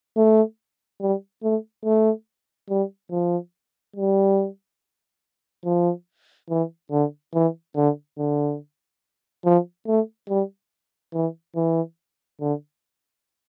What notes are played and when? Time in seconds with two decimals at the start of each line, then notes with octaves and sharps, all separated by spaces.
0.17 A3
1.01 G3
1.43 A3
1.85 A3
2.70 G3
3.11 F3
3.96 G3
5.65 F3
6.50 E3
6.91 D3
7.34 E3
7.76 D3
8.18 D3
9.45 F3
9.87 A3
10.29 G3
11.14 E3
11.56 E3
12.41 D3